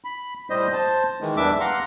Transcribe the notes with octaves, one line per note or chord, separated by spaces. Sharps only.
B5
A2 G3 C5 D#5
C5 A5
D#3 E3 G#3
E2 E3 G3 D4 E5 D6
F5 F#5 A#5 C6